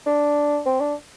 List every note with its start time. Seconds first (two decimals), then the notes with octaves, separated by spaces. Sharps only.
0.06 D4
0.66 C4
0.80 D4